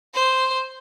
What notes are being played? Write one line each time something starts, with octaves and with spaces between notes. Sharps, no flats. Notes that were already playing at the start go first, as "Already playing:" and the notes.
C5